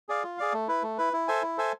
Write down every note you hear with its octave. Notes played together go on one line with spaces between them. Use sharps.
G#4 D5 F5
F4
G#4 D5 F5
A3
E4 B4
A3
E4 B4
E4
A4 C5 E5 G#5
E4
A4 C5 E5 G#5